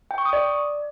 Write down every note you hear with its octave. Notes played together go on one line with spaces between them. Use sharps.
G5
C#6
D#6
D5